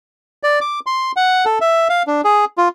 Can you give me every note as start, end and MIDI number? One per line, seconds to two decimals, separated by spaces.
0.43 0.59 74
0.61 0.80 86
0.86 1.12 84
1.16 1.45 78
1.45 1.59 69
1.61 1.88 76
1.89 2.03 77
2.07 2.21 62
2.24 2.45 68
2.58 2.69 65